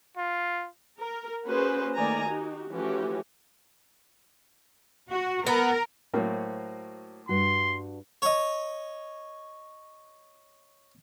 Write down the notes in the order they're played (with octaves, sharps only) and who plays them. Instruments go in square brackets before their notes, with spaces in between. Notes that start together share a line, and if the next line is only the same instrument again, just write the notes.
[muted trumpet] F4
[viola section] A#4
A#3 C#4 F#4 G#4 B4 C5
D#3 A3 A#3 D5 G#5 A#5
D#4 F#4 G4
E3 F3 A3 C#4 F#4 G4
[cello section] F#4
[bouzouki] B3 [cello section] A#4
[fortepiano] A2 F#3 A#3 [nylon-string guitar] F#4 C5 C#5
[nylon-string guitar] G2 F#4 [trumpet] C6
[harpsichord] C#5 D#5